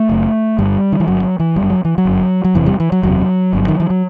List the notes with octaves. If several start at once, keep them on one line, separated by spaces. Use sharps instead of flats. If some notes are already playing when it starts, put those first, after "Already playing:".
Already playing: A3
F#1 F#2
G1 G2 G3
D#3
E3
G1 G2 F#3
F#3
E3
G1 F#2 G3
F#3
E3
F#3
G1 F#2
F#3
F#1 E2 C3 E3
G3
E3
F#3
F#1 E2 C3 F#3
G1 G2
D#3
E3
F#3